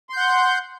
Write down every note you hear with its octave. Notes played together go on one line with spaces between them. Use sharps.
F#5 C6 G6